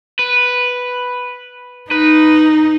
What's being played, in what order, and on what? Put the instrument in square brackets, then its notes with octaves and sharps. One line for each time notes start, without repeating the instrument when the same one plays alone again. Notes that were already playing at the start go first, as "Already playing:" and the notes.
[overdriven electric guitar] B4
[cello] D#4 [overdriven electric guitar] B4